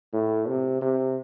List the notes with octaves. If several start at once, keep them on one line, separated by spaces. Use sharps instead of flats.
A2
C3
C3